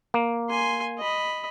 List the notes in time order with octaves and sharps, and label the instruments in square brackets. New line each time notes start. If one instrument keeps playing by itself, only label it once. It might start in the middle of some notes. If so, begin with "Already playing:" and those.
[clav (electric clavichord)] A#3
[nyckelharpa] G#5 C6
D#5 B5